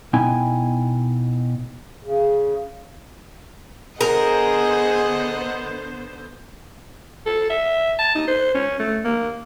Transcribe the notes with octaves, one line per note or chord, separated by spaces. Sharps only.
B2 B3 D#4 E4 G5 G#5
C#3
D3 B3 G#4 A#4 C5 D#5 F#5
A4
E5
A5
D#4
C5
C#4
A3
A#3